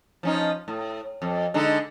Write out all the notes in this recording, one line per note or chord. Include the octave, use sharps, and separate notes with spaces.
F3 C#4 D#4
A2
F2
D3 G#3 D#4